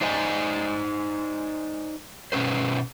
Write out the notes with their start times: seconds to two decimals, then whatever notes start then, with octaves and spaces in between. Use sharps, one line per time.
0.01 D4 D#4 C5 D5 D#5 G#5
2.32 G2 B2 C#4 B4 C5